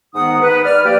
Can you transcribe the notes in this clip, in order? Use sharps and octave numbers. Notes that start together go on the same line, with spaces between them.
G#2 D#3 B3 D#4 F#5 D#6
B4
D5 F6
F3 A#3 G4 D5